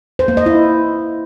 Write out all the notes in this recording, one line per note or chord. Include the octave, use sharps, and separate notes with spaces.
C5
A#3
D#5
E4